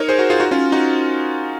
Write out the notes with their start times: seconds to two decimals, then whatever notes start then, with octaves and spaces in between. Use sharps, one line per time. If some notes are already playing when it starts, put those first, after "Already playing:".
Already playing: D#4 A#4 C#5
0.09 G#4 C5
0.19 F#4 A#4
0.30 F4 G#4
0.40 D#4 F#4
0.51 C#4 F4
0.72 D#4 F#4